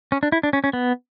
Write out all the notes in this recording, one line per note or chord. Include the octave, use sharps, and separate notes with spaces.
C#4
D4
E4
D4
C#4
C#4
B3